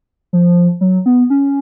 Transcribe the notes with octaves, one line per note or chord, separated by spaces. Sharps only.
F3
F#3
B3
C#4